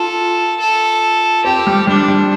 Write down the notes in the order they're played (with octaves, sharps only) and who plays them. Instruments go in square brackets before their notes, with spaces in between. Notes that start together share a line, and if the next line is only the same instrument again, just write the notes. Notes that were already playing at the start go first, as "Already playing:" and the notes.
Already playing: [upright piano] F4 [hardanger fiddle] A4
[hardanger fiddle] A4
[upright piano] C4 [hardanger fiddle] G4
[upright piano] G3
[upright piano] G3 [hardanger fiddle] D4
[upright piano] G3